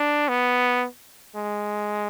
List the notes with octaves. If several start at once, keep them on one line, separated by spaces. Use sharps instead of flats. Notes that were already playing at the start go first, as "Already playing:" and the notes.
Already playing: D4
B3
G#3